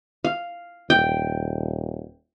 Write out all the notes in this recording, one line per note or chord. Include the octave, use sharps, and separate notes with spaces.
F5
D#1 G5